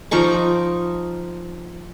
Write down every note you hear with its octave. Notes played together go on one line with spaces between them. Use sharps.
F3 D#4 C#6 D6